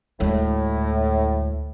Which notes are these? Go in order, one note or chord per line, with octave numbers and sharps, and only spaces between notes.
D2 A2 G#3